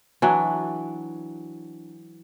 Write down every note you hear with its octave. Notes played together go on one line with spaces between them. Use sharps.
E3 F#3 D4